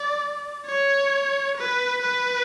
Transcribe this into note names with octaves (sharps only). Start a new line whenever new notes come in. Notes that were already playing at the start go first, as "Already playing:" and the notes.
Already playing: D5
C#5
B4
B4